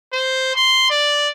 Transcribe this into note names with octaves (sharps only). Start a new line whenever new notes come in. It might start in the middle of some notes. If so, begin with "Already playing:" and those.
C5
C6
D5